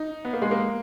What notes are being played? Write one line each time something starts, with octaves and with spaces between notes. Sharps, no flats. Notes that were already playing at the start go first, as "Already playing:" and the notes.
Already playing: D#4
B3
A#3
G#3
A#3